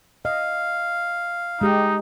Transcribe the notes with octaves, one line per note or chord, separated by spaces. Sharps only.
D#5 F5
G#3 D#4 G4